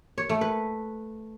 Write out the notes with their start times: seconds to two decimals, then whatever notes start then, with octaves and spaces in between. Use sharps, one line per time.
0.18 C#5
0.29 A3
0.41 B4